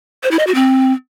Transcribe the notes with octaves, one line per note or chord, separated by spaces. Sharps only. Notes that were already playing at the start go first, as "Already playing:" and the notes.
C5
E4
D#5
F#4
C4